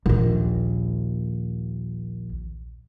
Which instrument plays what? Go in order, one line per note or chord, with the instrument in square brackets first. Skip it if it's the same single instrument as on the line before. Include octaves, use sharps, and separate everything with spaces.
[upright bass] A#1 D#2